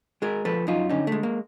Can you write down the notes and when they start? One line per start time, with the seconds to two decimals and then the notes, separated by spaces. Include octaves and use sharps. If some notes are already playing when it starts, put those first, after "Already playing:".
0.22 G#3 G#4 A#4
0.45 F3 A4 B4
0.67 F#2 D#4 F4
0.89 D3 C#4 D#4
1.07 G#3 A3
1.23 A#3